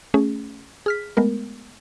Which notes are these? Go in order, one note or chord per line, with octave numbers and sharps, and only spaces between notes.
A3 C#4 G#4
G#4 F6 B6
G#3 A3 B3 A#4